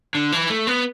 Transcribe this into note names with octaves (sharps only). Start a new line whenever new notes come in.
D3
E3
A3
B3